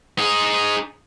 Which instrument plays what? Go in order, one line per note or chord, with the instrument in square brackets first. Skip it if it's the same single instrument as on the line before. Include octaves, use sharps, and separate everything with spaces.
[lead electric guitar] D#4 G#4